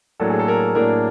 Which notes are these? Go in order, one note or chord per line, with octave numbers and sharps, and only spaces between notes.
A2 F#3 A#3 D4 A4
G#4
A4
A#4
A2 F#3 A#3 D4 A#4